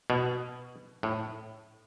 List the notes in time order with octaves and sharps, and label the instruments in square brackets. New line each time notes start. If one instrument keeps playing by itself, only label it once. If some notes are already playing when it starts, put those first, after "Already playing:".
[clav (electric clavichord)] B2
A2